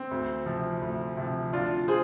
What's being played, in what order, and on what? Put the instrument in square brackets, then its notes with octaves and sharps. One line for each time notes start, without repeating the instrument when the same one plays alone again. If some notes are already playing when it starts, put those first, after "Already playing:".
Already playing: [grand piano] C4
D2
C3 F3
D2
C3 F3
D2 D4 F4
G#4 C5